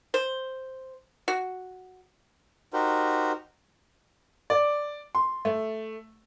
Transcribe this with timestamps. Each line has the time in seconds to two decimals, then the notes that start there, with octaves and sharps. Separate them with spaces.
0.14 C5
1.28 F#4
2.73 D#4 F#4 G4 A#4 C5
4.50 D5
5.15 C6
5.45 A3